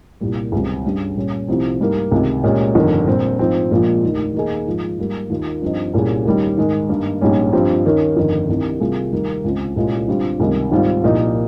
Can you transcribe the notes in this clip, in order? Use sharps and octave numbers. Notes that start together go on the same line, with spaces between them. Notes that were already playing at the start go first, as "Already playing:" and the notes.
C2 A#2 G3 A#3
C#2 C3 D#3 G3 C4
G2 G3 C#4
A#2 G3 C#4
C2 C3 F3 C4
G#2 G3 A#3
C#2 C3 D#3
A#2 G#3 C#4 G4
G1 F2 D#3
A#2 G3 C4
G#2 F3 C4
A#1 A#2 F3 G#3
F1 D#2 D#3
D#2 D#3 A#3 D#4 G#4
G#2 F3 G#3
G#2 G3 A#3
D#2 D#3 A#3 F4
G2 F3 C4 D#4
C2 A#2 G3 C#4 G#4
D#2 D#3 G3 C#4
G#2 D#3 G#3
G2 D#3 A#3
A#1 G#2 G3 C#4
G2 F3 C4 G4
D#2 D#3 A#3 C#4
G1 F2 D#3
C2 C3 D#3
C3 G3 A#3 F4 G#4
D#2 D#3 G3 A#3
C#2 C#3 G#3 C4 F4
C2 A#2 G#3 C#4 F4
G1 G2 G3 C4 F4
C#2 C3 D#3 G3
G#1 G#2 G3 C4 F4
C2 A#2 F3 A#3 D#4